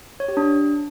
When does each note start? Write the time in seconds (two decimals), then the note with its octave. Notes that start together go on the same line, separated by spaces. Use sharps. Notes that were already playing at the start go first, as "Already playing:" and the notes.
0.20 C#5
0.28 G4
0.37 D4